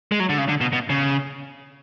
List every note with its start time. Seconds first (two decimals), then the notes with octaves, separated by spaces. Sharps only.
0.12 G#3
0.20 F#3
0.29 D3
0.38 C#3
0.49 D3
0.61 B2
0.73 B2
0.90 C#3